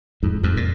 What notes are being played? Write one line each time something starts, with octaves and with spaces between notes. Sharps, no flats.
F2 G#2
F2 G#2
A#2